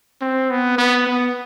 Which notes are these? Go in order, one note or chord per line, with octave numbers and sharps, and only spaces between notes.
C4
B3
B3
B3